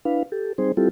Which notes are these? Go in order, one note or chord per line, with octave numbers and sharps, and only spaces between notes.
D4 E4 B4 F5
G4 A4
G3 C4 D#4 G#4 C5
G3 C4 E4 F4 G4 A4